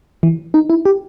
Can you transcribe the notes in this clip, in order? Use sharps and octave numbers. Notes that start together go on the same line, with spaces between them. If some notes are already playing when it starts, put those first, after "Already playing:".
E3
D#4
E4
G4